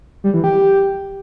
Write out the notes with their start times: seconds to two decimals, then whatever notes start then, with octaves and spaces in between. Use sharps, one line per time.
0.24 G3
0.34 E3
0.44 G4